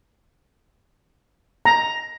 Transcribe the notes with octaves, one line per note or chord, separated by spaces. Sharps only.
A#5